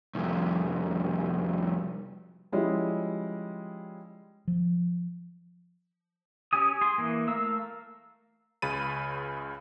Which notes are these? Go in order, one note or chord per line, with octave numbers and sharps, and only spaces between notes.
C2 F2
F3 G3 G#3 C#4 E4
F3
C#4 G4 G#5 D#6
G#4 C6
E3 A#3
A3 A#4 F5 E6
C#2 C#3 B5 A6 D#7